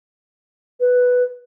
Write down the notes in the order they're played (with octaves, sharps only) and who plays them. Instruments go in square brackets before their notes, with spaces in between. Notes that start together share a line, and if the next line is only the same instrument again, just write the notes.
[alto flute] B4